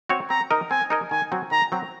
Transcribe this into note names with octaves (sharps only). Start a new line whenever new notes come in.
C4 F#4 C#5
C4 A#5
D#4 A#4 D#5
C4 G#5
D#4 A#4 D#5
D#3 G#5
F#3 C4 F#4
D#3 A#5
F#3 C4 F#4